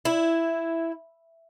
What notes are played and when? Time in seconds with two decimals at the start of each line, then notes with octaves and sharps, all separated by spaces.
0.05 E4